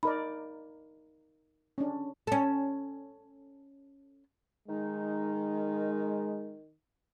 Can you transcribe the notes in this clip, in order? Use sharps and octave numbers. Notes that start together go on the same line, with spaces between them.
D#4 A#4 D5 B5
C#4 D4
C#4 A4
D#3 G#3 D#4